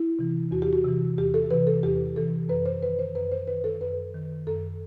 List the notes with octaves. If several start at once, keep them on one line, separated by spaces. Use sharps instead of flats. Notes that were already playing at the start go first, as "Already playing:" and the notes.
Already playing: E4
C3 E3
E2 F#4
G4
F#4
C3 E3
E2 G4
A4
C3 E3 B4
A4
E2 G4
C3 E3 A4
F#2 B4
C5
D#3 B4
C5
F#2 B4
C5
D#3 B4
A4
F#2 B4
D#3
F#2 A4